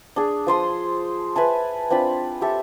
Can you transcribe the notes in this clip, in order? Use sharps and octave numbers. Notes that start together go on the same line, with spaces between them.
D4 G#4
F3 C5 C6 D#6
B4 E5 G#5 A5
C4 D4 F4 B5
G4 A4 E5